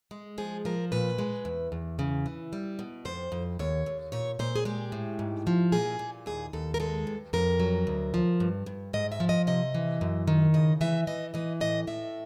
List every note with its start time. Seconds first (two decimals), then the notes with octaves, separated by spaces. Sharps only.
0.11 G#3
0.38 F3 G#4
0.65 F3 A#4
0.92 A#2 B4
1.18 G#3
1.45 E2
1.72 E2
1.99 C#3
2.26 E3
2.53 G3
2.79 B2
3.05 F2 C5
3.32 F2
3.59 D#2 C#5
3.86 D#2
4.12 A#2 C#5
4.39 A#2 C5
4.56 G#4
4.65 G#3 G4
4.92 A2
5.19 G#2
5.47 F3
5.72 A#2 G#4
5.99 A#2
6.26 D#2 G#4
6.53 D#2 A4
6.74 A#4
6.80 G#3 A4
7.07 G2
7.33 F2 A#4
7.60 F#3
7.87 D2
8.14 F3
8.40 G2
8.66 G2
8.93 G#2 D#5
9.12 E5
9.20 F3
9.29 D#5
9.47 C3 D#5
9.75 E3
10.01 F#2
10.27 D#3
10.54 C#3 D#5
10.81 E3 E5
11.07 E3 D#5
11.34 E3 D#5
11.61 A2 D#5
11.87 A2 E5